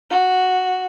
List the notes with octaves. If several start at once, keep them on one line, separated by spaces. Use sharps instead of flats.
F#4